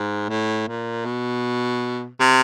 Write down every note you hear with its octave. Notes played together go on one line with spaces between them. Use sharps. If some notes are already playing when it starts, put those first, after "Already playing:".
Already playing: G#2
A2
A#2
B2
C3